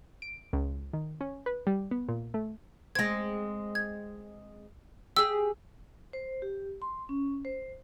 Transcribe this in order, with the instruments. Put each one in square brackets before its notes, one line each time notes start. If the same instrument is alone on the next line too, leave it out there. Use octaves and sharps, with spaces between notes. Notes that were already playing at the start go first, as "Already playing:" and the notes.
[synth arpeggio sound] D7
C#2
D#3
C#4
B4
G3
B3
A#2
A3
[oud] G#3 C4 [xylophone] G#6 A#6
[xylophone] G#6
[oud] G4 G#4 [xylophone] E6
[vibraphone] C5
G4
C6
C#4
C5